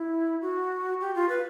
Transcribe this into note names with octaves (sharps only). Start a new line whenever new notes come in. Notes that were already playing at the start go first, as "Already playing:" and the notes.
Already playing: E4
F#4
G4
F4
B4